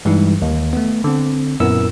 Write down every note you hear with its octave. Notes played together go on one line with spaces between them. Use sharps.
G2 E3 G3 G#3 D#4 E4
D#2
A3 B3
D3 C4
F#2 A#2 B3 E4 A#4 E6